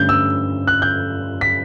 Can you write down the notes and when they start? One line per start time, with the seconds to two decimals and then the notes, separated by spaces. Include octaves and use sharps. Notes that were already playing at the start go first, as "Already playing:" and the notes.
Already playing: G2 D3 A3 C#4 G6
0.09 E6
0.67 F#6
0.82 G6
1.41 B6